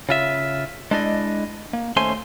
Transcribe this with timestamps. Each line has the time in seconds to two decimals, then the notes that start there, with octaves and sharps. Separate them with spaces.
0.09 C#3 F4 E5
0.91 G#3 D4 E4 D5 D#5
1.73 A#3
1.96 D#2 A3 C#4 C5 G#5 C6